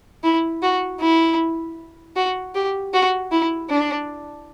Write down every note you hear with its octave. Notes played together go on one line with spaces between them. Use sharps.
E4
F#4
E4
F#4
G4
F#4
E4
D4